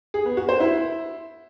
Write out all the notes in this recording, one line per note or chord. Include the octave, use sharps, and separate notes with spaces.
G#4
B3
F#4
C5
E4